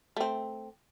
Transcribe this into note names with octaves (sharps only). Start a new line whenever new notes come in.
A3 C4